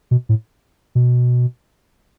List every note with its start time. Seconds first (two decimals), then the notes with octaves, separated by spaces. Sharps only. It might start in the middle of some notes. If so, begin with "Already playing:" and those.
0.11 B2
0.29 A2
0.95 B2